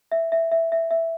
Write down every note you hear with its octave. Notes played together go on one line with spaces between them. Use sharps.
E5
E5
E5
E5
E5